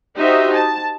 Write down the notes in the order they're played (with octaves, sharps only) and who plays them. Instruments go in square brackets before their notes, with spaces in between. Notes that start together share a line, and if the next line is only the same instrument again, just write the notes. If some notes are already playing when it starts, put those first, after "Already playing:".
[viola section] D#4 F#4 G4 C5 D#5 E5
A5